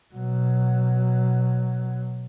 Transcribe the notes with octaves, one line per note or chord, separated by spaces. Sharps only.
B2 F#3